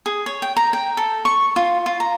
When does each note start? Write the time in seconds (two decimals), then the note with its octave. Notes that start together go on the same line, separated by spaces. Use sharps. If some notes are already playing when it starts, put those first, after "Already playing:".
0.06 G#4
0.26 C#5
0.42 G5
0.57 A#5
0.73 G5
0.97 A4
1.25 C#6
1.56 F4
1.86 F4
2.00 A#5